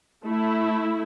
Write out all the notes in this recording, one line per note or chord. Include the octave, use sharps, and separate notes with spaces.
A3 E4